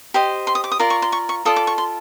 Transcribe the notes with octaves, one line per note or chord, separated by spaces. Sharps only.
G4 C5 D#5
C6
D#6
D6
D#6
F4 A#4 D5
C#6
C6
C#6
C#6
F4 A4 D5 D#6
D6
C#6
C6